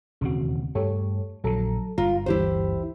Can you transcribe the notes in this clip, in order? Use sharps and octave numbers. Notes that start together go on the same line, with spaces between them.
E1 D#2 C#3 C4 F#4
G2 A3 G4 A4 C#5
A#1 D3 F#3 A4 A#5
G1 G2 F4 A#5
D2 E3 E4 G4 C5